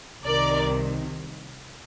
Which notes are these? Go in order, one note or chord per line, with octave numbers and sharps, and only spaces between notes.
C2 C3 D#3 A#4 D5